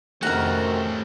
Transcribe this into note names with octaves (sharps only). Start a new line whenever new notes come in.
F2 C3 D#3 A3 C#4 F#4 A#4 F#5